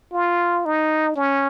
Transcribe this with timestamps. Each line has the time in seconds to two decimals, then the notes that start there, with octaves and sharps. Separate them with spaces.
0.13 F4
0.65 D#4
1.16 C#4